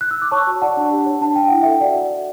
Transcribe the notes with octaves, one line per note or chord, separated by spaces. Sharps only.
F#6
E6
D6
C#5 A5 C#6
F#4
D5 F#5 A5
D4
G4
C#5
D4 A5
D4 G5
E4 F#5
A4 E5 G5
F#4 D5 F#5
F#4
F#4